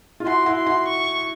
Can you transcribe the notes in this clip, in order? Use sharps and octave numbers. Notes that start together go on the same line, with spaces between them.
F4
E4 F#4 C6
E4 F#4
C6
E4 F#4
C#6